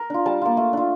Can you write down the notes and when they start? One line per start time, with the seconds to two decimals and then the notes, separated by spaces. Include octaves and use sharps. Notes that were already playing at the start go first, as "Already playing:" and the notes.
Already playing: A#4
0.10 D4 F4
0.26 G3 A5
0.42 A#3 F4
0.57 A3
0.73 D4 F4